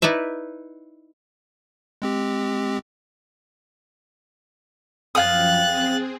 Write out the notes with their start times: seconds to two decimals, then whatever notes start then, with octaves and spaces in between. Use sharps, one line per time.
0.02 D#4 E4 B4 D5 E5
2.02 G#3 C4 G4
5.15 F#2 F3 F5 G5 D#6 F#6 A6
5.65 C4 G#4